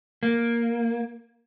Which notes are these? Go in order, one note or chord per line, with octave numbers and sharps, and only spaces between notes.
A#3